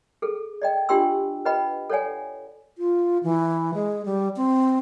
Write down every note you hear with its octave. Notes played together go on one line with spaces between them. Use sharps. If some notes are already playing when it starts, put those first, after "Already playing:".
G#4 A4
D5 D#5 G5
D4 F4 G4 G5 C6 E6
B4 D#5 F#5 G5 B5
A4 C#5 D5 F#5 G#5
F4
E3
G#3
G3
C4